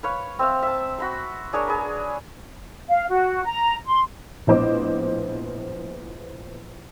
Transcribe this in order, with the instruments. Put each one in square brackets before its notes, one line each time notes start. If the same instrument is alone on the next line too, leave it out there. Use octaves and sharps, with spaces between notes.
[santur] B4 C#5 F5
C4 E5 F5
E5 A5
F#4 B5 C6
D4 G#4 A#4 C#5
G#4 B4
[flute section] F5
F#4
A#5
C6
[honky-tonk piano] A#1 A2 B3 C5 D#5 D6